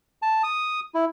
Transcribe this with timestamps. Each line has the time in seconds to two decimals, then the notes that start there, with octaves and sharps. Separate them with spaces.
0.22 A5
0.43 D#6
0.94 E4